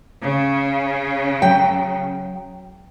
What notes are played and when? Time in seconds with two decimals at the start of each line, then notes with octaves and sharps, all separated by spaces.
0.23 C#3
1.42 F#3 G5